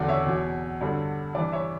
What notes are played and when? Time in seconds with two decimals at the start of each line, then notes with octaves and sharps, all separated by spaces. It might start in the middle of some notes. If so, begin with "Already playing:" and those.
Already playing: E2 D3 F#3 D5 F#5
0.08 C#5 E5
0.26 E2 B2 F#3
0.81 G2 D3 F#3
1.34 G2 E3 D5
1.52 C#5 E5